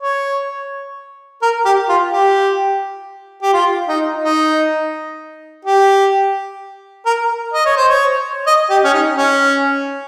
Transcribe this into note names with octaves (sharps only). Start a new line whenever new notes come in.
C#5
A#4
G4
F4
G4
G4
F4
D#4
D#4
G4
A#4
D#5
C#5
C5
C#5
D#5
G4
C#4
D#4
C#4